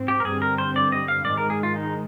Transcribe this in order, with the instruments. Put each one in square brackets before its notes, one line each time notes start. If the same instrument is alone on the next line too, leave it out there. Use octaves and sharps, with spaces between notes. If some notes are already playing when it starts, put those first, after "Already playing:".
Already playing: [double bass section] G#2 C4
[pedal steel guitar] G4
A#4
[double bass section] G2 D3 G3 C4 [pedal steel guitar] G#4
[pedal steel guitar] A#4
C5
D5
D#5
F5
[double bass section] G#2 D#3 G#3 [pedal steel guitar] D5
[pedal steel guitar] A#4
G#4
F4
D#4